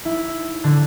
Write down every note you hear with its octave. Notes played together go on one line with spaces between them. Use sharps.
E4
D3